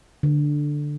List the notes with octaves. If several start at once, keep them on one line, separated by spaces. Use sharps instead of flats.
D3